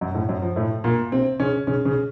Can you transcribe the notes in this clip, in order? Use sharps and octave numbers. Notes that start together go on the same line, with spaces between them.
F#2 F#3
A2 A3
F#2 F#3
F3
A2 A3
A#2 A#3
C3 C4
C#3 C#4
C#3 C#4
C#3 C#4